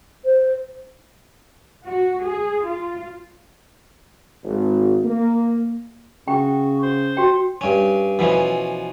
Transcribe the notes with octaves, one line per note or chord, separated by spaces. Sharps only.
C5
F#4
G#4
F4
G#1
A#3
C#3 F#4 G5
C5 C6
F#4 G5
G2 C#4
B2 E3 F3 C#4